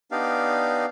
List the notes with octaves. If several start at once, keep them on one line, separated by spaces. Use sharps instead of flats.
B3 D4 D#4 G4 D5 F5